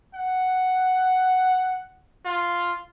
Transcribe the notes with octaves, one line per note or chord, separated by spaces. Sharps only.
F#5
F4